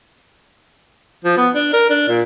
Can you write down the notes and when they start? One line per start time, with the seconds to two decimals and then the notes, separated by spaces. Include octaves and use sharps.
1.24 F3
1.37 B3
1.54 D4
1.73 A#4
1.90 D4
2.08 A#2